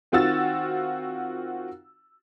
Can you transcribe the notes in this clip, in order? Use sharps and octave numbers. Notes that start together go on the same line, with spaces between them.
D#3 C4 F4 F#4 E6 A6